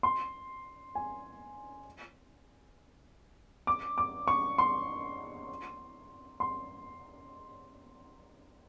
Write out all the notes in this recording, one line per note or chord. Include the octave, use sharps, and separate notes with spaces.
C6
G#5
D6
D6
C#6
C6
C6